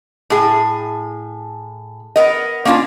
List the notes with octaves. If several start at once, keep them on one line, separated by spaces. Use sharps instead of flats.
A2 G#4
B3 A#4 D#5
A#3 C#4 D4 E4 F4